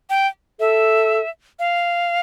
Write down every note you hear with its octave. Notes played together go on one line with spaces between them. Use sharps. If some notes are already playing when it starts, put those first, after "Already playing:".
G5
A4 E5
F5